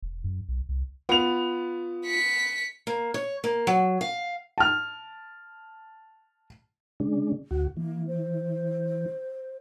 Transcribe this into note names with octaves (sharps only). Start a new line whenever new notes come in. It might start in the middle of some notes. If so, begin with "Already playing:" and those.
E1
F#2
B1
C2
B3 F4 F7
B6 C#7
A#3
C#5
A#3
F#3
F5
A5 F6
C#3 G#3 D4
D2 F#4
E3 A#3
C5